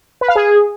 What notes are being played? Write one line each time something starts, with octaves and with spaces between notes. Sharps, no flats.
B4
F5
G#4